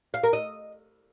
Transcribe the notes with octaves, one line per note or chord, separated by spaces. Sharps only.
F5
A#4
D#5